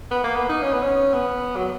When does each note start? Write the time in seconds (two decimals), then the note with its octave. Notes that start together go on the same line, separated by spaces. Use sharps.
0.11 B3
0.24 A#3
0.36 B3
0.49 D#4
0.62 C#4
0.72 B3
0.82 C#4
1.13 B3
1.56 F#3